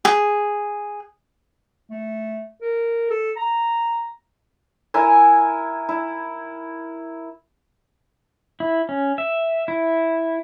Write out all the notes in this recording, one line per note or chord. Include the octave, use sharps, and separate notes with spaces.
G#4
A3
A#4
A4
A#5
E4 A#4 E5 G#5
E4
E4
C#4
E5
E4